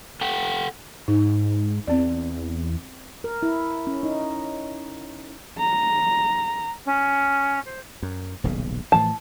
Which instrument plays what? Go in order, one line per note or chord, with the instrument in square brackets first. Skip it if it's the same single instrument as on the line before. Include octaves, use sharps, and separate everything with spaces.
[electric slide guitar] A4 F#5 G5
[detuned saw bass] G#2 [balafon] D#4
[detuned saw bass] E2 [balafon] C4 D5
[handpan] A#4
E4
C#4
D#4
[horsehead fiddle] A#5
[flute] C#4
C5
[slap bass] F#2
D#1 B1 C#3
[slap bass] A2 E3 F3 [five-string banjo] A5